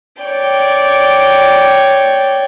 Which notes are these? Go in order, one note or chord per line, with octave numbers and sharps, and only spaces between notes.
C#5 D5 G5